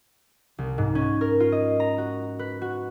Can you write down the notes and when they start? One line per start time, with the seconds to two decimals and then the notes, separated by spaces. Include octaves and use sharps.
0.58 C2
0.78 G#2
0.95 C#4
1.21 A#4
1.40 F4
1.52 D#5
1.80 A#5
1.98 F#4
2.39 B4
2.62 F#4